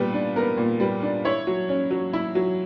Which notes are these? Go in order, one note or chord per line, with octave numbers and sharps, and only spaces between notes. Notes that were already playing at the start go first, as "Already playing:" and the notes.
Already playing: A#2 G3 B3 B4
D4
B3 A#4
A#2
G3 B4
D4
E4 C#5
F#3
C#4
F#3
E4
F#3